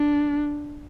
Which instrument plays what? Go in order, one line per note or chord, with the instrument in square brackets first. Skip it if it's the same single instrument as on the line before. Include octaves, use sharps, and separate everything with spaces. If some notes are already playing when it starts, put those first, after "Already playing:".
Already playing: [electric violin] D4